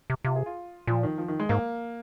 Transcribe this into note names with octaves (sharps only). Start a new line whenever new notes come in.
C3
C3 F4
G#4
F4
A#2 F3
D#3
F3
D#3
G#3
G#2 A#3